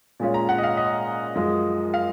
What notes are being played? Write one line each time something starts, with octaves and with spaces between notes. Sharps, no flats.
A#2 G#3 C#4 F4
A#5
F#5
D#5
F5
D#5
F#2 F3 G#3
F5